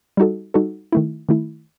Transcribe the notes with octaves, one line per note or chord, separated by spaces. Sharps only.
G3 D#4 F#4 A4
G3 D#4 F#4 A4
D#3 A3 E4
D#3 A3 E4